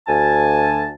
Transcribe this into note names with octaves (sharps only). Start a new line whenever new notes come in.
D2 G#5 A5